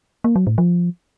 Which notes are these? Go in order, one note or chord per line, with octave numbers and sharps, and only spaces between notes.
A#3
F#3
A2
F3